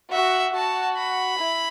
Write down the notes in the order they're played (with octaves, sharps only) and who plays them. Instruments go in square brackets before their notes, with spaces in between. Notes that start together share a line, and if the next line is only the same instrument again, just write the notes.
[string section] F#4 [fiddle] E5
[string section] F#4 [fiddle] A5
[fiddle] B5
[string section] E4